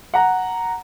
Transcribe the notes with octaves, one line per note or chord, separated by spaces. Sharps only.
F#5 A#5